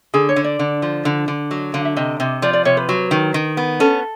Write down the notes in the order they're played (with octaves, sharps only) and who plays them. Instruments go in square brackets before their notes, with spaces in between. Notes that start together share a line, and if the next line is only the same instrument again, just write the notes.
[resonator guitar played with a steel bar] D3 [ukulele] G#4
[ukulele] C#5
[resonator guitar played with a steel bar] D3
[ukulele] D5
[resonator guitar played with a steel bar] D3
F3
D3
D3
[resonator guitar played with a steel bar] F#3 [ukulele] D#5
[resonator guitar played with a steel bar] D3 [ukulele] F5
[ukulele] E5
[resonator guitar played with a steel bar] C3 [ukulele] D#5
[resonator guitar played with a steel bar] C3 [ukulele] D#5
[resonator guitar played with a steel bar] F3 [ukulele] D5
[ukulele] D5
[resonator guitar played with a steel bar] C3 [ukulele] C#5
[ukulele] B4
[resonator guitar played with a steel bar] F#3
D#3
D#3
B3
[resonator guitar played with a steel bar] C#4 [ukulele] A4